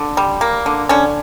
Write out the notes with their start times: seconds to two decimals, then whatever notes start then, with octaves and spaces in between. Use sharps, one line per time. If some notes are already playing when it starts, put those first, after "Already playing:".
Already playing: D3
0.17 G3
0.41 A#3
0.66 D3
0.89 D3 C#4